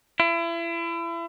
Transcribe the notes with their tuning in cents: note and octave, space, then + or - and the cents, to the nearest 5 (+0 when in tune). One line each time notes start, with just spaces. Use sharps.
E4 +35